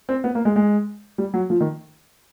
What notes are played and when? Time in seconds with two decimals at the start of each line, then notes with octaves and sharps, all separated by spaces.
0.09 C4
0.24 B3
0.35 A#3
0.45 G#3
0.56 G#3
1.18 G3
1.34 F#3
1.50 F3
1.60 D#3